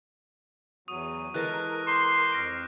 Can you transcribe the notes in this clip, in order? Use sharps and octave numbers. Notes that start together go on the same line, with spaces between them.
E2 F#3 C#6 D#6 D#7
E3 G#3 A4 A#4 F#6 A#6
C6 D6 G6
F2 F6 A#6 C7 D7